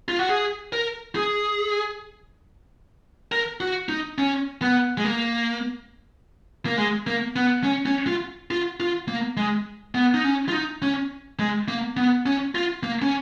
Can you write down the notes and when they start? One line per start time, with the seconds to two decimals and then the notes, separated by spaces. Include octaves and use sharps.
0.08 F4
0.19 F#4
0.29 G#4
0.73 A#4
1.16 G#4
3.32 A#4
3.60 F#4
3.89 D#4
4.18 C#4
4.62 B3
4.98 G#3
5.04 A#3
6.66 A#3
6.78 G#3
7.07 A#3
7.36 B3
7.64 C#4
7.86 C#4
8.07 F4
8.51 F4
8.80 F4
9.08 A#3
9.37 G#3
9.95 B3
10.14 D#4
10.24 C#4
10.48 F4
10.52 D#4
10.82 C#4
11.39 G#3
11.68 A#3
11.97 B3
12.26 C#4
12.55 F4
12.83 A#3
13.02 C#4